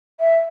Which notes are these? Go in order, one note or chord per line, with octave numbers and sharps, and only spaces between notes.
E5